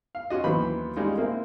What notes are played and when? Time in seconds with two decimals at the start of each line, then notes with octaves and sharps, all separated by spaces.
0.15 F5
0.30 C#4 F4 F#4 D#5
0.44 D#2 E3 F#3 B3 C5 B5
0.96 G3 G#3 C#4 D#4 F4
1.17 A#3 C4 E4